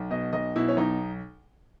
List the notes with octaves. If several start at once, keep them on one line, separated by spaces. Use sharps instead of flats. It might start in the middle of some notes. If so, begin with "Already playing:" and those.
Already playing: B1
B2 D#5
B1 D#5
B2 E4
C#4
B1 D#4